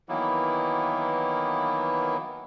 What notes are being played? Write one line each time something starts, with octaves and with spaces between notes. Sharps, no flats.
D#3 E3 F#3 A#3 B3 E4